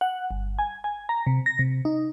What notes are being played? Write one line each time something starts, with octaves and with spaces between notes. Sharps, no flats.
F#5
G1
G#5
G#5
A#5
C3
A#6
C3
D#4